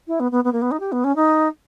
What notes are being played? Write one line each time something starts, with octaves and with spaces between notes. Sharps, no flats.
E4
B3
B3
B3
A#3
B3
D#4
G4
B3
C#4
D#4